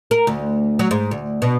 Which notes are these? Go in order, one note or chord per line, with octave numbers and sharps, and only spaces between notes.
A#4
D2
F#3
G#2
D2
B2